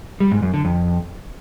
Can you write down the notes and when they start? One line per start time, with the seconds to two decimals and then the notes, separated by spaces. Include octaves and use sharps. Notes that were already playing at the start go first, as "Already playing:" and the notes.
0.20 G3
0.31 G#2
0.43 F#2
0.54 D3
0.65 F2